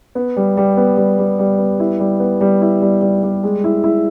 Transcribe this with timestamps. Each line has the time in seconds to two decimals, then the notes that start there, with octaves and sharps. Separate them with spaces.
0.15 B3
0.37 G3
0.57 G3
0.77 B3
0.97 G3
1.19 G3
1.39 G3
1.58 B3
1.80 E4
2.00 G3
2.20 B3
2.41 G3
2.62 E4
2.82 G3
3.01 G3
3.23 G3
3.43 G#3
3.64 E4
3.84 E4